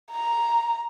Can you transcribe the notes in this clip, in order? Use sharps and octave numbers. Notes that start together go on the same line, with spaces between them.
A#5